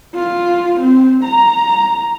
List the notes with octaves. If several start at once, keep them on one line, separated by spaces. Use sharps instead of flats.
F4
C4
A#5